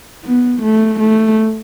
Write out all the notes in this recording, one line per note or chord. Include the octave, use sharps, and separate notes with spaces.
B3
A3
A3